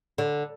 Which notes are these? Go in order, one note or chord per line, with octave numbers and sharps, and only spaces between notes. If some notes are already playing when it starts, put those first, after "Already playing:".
D3